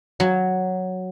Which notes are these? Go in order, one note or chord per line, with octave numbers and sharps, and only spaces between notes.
F#3